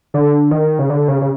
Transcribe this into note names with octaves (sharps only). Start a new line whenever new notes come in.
D3
D#3
C#3
D3
C#3
C#3